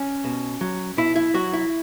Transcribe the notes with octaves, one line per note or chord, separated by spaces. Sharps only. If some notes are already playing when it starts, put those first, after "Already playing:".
Already playing: C#4
B2
F#3
B2 E4
E4
F#3 F#4
E4